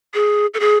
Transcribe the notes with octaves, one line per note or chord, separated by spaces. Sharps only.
G#4
A4
G#4